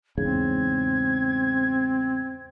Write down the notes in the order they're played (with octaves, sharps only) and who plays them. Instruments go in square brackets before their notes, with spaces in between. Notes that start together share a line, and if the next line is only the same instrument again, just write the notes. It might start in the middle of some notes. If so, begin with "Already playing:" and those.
[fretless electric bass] E2 G#2 C#3 [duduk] C4 [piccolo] G#6